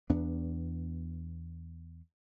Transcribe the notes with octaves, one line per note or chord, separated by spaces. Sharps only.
E2 B3 D4